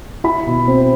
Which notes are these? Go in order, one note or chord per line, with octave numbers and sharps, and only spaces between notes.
E4 B5
B2
C4